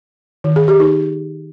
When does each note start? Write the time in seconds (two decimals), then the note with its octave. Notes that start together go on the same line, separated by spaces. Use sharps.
0.44 D#3
0.56 G#4
0.68 G4
0.80 D#4